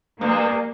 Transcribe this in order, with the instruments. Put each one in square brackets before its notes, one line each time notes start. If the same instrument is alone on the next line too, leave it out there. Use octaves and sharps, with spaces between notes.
[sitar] G2 [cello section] A#3